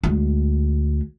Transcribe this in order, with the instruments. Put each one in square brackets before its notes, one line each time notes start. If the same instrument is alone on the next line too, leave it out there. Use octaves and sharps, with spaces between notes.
[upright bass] D2 G#3